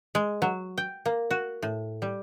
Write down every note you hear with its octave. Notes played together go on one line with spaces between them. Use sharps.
G#3
F#3
G5
A#3
F#4
A2
G3